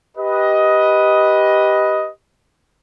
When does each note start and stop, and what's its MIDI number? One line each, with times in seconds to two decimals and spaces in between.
0.17 2.09 67
0.17 2.09 71
0.17 2.09 75